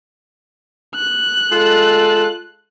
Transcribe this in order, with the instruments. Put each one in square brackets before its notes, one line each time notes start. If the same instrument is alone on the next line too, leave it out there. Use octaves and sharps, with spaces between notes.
[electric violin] F#6
[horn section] G#3 F4 A4